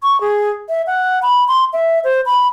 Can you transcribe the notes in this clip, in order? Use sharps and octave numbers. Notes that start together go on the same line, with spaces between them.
C#6
G#4
E5
F#5
B5
C6
E5
C5
B5